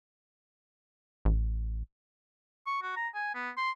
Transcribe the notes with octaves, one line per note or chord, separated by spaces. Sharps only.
A1
C#6
F#4
A#5
G#5
B3
C6